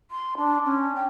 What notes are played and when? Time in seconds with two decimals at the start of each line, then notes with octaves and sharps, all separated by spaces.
0.11 C6
0.37 D4
0.64 C#4
0.95 G5